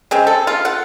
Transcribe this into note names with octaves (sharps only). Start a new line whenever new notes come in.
C#3 G#3 C4
A4
F4
F#5